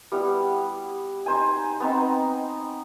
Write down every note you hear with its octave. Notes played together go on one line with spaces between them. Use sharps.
G3 B3 E4 F#5
D#4 C5 G#5
B3 C4 D#4